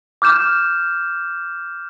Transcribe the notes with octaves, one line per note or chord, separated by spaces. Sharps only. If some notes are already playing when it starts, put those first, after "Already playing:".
D6 F6 G6 E7